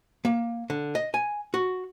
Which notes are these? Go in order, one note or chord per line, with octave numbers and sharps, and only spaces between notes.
A#3
D3
D#5
G#5
F#4